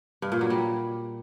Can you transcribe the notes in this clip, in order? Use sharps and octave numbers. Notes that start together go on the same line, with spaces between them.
G2
A#2
F#3
G3